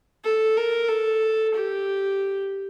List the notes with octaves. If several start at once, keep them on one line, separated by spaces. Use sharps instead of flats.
A4
A#4
A4
G4